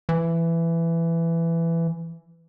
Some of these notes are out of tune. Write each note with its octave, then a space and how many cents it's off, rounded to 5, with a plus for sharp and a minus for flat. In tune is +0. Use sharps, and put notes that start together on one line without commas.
E3 +15